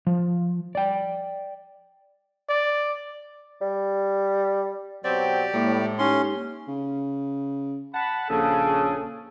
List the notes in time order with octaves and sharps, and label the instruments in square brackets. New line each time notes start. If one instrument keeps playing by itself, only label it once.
[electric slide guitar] F3
D5 G5
[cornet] D5
[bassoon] G3
[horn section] B2 F#3 C4 [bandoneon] G4 D5 [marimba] A6
[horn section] A2 [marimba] G#3 A#3
[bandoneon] C#4 C6 [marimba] D#4 G4
[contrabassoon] C#3
[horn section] F#5 A5 B5
[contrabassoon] A#1 [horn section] C#3 G#4 [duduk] A4